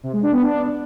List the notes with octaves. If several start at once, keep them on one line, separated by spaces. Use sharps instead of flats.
C3
G#3
D4
B3
D4